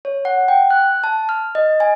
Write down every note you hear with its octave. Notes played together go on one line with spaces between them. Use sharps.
C#5
F#5
G5
F#6
A5
F6
D#5
G#5